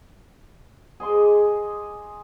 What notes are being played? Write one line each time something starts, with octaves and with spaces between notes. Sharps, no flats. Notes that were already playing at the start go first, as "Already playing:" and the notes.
G#4 D#5 C6 D6